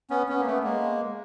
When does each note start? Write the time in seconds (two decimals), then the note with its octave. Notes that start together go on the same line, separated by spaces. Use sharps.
0.10 B3 C#4
0.29 B3 C#4
0.39 A#3
0.46 A3 B3
0.63 G#3 A#3